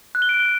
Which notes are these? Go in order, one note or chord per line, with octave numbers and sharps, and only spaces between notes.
F#6
G7
D7